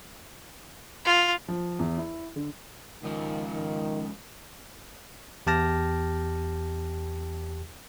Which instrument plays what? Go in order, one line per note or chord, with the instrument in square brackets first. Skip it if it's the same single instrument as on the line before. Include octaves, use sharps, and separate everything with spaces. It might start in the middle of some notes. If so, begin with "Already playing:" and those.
[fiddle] F4
[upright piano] F3
E2
E4
D3
[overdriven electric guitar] C#2 F3 [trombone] D#3
[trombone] D#3
[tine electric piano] E2 G4 G5 A5 F6 A#6